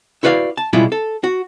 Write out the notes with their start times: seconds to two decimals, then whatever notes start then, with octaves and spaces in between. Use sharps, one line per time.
0.23 E4 F#4 B4 D5 F5
0.57 A5
0.73 B2 G3 G#3 E4 F4
0.92 A4
1.24 F#4